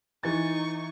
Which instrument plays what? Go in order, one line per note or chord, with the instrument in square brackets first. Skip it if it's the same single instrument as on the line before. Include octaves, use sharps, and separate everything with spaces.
[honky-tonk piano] E3 A6 [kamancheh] D#4 C#6